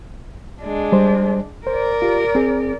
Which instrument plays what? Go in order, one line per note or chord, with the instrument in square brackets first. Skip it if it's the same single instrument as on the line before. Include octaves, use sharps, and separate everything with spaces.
[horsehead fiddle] G#3 D4
[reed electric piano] G3 C5
[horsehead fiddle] A#4 D5 [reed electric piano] C5
[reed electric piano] F4 G4
C4 G#4